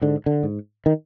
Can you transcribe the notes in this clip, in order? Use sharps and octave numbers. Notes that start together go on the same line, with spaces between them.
G#2 D3
D3
G#2
D#3